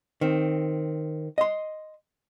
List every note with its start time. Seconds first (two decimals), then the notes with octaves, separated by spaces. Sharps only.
0.21 D#3 C4
1.38 D#5 C6